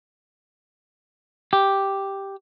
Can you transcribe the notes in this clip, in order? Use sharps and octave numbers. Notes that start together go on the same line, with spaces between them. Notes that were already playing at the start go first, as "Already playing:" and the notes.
G4